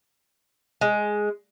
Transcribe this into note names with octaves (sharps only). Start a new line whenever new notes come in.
G#3